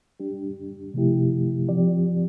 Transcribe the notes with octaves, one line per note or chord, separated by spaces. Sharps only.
G3 D4 G4
C3 F3 A3 E4 G4
F3 C4 G4 D5